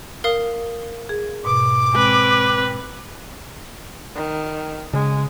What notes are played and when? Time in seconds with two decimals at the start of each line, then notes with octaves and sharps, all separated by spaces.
0.24 A#4 F5 D#6
1.09 G#4
1.45 G#2 B2 D6
1.94 G#3 C4 B4
4.16 D#3
4.93 C#3 G#3